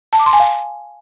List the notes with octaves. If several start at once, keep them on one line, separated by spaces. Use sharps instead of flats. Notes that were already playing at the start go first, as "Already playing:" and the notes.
A5
D6
C6
G#5
F5